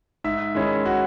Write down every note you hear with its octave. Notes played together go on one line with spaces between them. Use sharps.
G#2 E5
D#3 G#3 C#4 E4
F#4